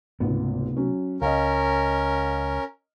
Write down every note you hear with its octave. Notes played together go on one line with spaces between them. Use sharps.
G#1 C#2 C3 A3 B3
F#3 C#4
C#2 C#4 A#4 D#5 F5